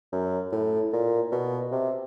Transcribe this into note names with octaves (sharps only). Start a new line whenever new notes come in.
F#2
A2
A#2
B2
C3